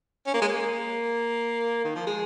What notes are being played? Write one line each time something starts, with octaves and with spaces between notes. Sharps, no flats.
C#4
A#3
G#3
A#3
D#3
F3
G#3